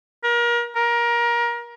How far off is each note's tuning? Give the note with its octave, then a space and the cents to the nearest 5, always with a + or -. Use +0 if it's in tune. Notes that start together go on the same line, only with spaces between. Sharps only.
A#4 +30
A#4 +25